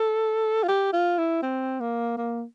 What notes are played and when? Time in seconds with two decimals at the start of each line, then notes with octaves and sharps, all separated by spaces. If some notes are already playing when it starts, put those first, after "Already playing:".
Already playing: A4
0.63 F4
0.68 G4
0.93 F4
1.18 E4
1.43 C4
1.80 A#3
2.17 A#3